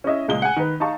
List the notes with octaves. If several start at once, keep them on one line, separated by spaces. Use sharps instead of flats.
C#4 E4 D#5 E5
C#2 A#2 G#3 G7
F#5 G#5
D#3 B4
D#4 F5 A5 C#6